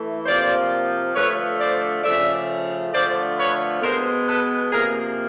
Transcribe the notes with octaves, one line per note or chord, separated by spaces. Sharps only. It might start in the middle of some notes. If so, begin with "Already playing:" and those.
Already playing: E3 A3
C3 F3 A#3 C5 D5
D3 F3 A3 B4 C#5
C5 D5
C#3 F3 A3 D5 E5
D3 F3 A3 C5 D5
B4 C#5
B2 G#3 B3 A#4 C5
A4 B4
C3 F3 A#3 G#4 A#4